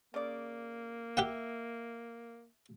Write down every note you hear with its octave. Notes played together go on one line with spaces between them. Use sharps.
C#3 A#3 D5
G4 E5 F#5 G5